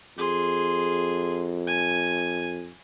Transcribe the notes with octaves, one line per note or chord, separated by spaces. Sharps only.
F2 G#4 C6
G#5